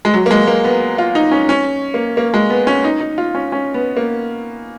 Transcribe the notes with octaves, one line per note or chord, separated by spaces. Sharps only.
G#3
F#3
A#3
G#3
A#3
B3
F4
D#4
C#4
C#4
A#3
A#3
G#3
B3
C#4
D#4
D#4
F4
C#4
C#4
B3
A#3